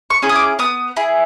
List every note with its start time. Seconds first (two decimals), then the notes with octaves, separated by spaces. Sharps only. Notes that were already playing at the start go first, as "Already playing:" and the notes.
0.10 C#6
0.22 C#4 E4 G#4
0.29 D#6
0.36 D6
0.59 B3 D#6
0.97 E4 G#4